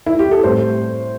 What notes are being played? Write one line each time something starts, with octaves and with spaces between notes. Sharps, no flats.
E4
G4
A4
A2 G3 C4 C5